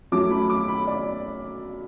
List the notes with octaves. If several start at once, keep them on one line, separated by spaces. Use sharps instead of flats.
F#2 F#3 A3 D6
B5
D6
B5
D5